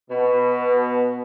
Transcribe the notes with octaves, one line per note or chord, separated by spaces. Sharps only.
B2